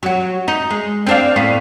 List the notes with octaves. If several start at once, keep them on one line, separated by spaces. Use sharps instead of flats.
F#3 F#4
D#4
G#3
C4 D4 F5
A2 B3 F5